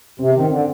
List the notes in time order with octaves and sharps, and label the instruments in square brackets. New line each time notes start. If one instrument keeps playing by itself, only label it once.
[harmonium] C3 [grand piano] C4
[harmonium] D#3 [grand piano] C4
[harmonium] D3